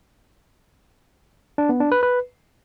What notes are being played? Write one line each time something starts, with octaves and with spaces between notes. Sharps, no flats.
D4
B3
D4
B4
B4